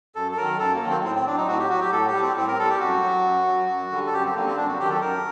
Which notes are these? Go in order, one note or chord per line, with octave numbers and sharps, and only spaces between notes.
F#2 A4
A4
D#3 F#3 A#4
F#2 A4
A#3
D#3 F#3
C4
A2 C4
C4
F#3 D4
D#4
A2 F#4
G4
F#3 F#4
G4
A2 A4
G4
G3
C4
A2 C4
A#4
G3 A4
G4
F#2 F#4
F#3
F#2
F#3
F#2
D3 G3
A4
F#2 G4
C4
D3 G3 A#3
C4
F#2 D4
F#4
D#3 F#3 G4
A4
F#2 A#4